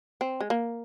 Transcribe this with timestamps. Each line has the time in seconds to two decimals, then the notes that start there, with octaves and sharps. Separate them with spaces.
0.21 C4
0.40 G#3
0.50 A#3